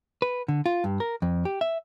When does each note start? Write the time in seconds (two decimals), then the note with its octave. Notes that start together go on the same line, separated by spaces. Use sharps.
0.22 B4
0.48 D3
0.66 F4
0.84 G2
1.00 A#4
1.22 F2
1.45 G4
1.61 E5